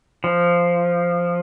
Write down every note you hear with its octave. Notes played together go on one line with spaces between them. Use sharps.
F3